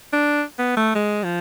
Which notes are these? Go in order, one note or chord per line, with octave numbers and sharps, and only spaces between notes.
D4
B3
A3
G#3
F3